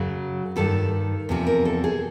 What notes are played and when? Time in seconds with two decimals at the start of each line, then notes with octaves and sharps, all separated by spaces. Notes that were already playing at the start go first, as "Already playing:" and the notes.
Already playing: F#2 C#3 F#3 G#4
0.56 G2 D#3 G3 A4
1.29 E2 C3 F3
1.47 A#4
1.65 A4
1.84 G#4